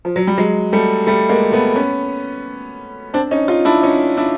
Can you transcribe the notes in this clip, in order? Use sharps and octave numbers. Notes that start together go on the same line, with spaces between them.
F3
F#3
G3
F#3 G#3
G3 A3
G3 A3
G#3 A#3
A3 B3
B3 C#4
C4 D4
C#4 D#4
D#4 F4
D4 E4
C#4 D#4
D4 E4